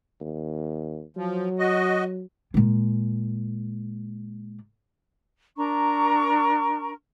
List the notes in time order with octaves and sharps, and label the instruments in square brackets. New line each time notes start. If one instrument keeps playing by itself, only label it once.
[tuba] D#2
[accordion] F3 [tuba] F#3
[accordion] F#4 D#5
[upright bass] A#2 G#3
[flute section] D4 A#4 A#5 C#6